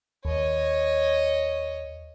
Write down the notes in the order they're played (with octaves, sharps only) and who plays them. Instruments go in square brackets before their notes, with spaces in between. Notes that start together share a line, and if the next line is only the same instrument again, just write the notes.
[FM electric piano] D#2 [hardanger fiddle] C#5 D#5